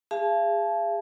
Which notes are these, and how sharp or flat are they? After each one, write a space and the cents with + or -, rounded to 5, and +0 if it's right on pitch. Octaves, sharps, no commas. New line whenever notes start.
G#4 -25 F5 -40 A5 -30